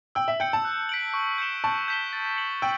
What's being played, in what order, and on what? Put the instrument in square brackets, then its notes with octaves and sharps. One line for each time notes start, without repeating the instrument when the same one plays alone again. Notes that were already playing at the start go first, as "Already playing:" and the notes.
[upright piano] G5 [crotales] E6
[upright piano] E5
[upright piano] G5 [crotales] G6 C#7
[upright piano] A5
[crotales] F#6
B6 D7 F#7
C#6
G6 C#7 E7 G7
[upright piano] A5 [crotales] C#6
[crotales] G6 B6 E7 G7
A6
C#7 F#7
[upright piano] G5 [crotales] E6